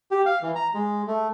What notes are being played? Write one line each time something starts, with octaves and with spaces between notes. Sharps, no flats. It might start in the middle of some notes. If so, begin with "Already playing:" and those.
G4
F5
E3
A#5
G#3
A3